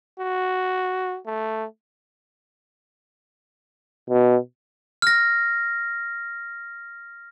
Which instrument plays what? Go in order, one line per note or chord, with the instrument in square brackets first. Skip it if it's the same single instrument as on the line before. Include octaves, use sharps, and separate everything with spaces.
[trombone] F#4
A3
[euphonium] B2
[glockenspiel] F6 A#6